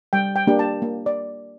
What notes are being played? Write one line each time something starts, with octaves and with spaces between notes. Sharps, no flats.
G3 G5
G5
A#3 D4 G4
A5
A#3
D5